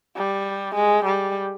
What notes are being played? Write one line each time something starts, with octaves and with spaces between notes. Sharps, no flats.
G3
G#3
G3